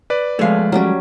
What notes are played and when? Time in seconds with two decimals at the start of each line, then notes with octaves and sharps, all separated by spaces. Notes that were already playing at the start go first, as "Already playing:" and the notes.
0.10 B4 D5
0.39 F3 G#3 A3 C#5 F5
0.72 F#3 G3 C#4